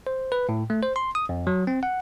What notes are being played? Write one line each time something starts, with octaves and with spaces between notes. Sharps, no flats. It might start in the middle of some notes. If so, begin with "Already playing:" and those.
C5
B4
A2
A3
C5
C6
D#6
F2
F#3
C4
F#5